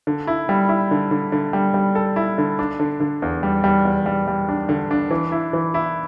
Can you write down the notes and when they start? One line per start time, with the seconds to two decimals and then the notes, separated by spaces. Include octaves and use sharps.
0.07 D3
0.27 E4
0.49 G3
0.69 E4
0.91 D3
1.11 D3
1.32 D3
1.53 G3
1.74 G3
1.95 A4
2.16 E4
2.38 D3
2.59 D4
2.80 D3
3.00 D3
3.22 E2
3.43 G3
3.64 G3
3.85 E2
4.06 G3
4.28 G3
4.49 D4
4.69 D3
4.91 D4
5.11 E3
5.32 E4
5.53 E3
5.74 E4